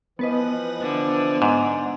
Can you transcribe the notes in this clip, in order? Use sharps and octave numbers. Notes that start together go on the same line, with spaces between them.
E3 F3 B3 B4 D#5
D3
G#2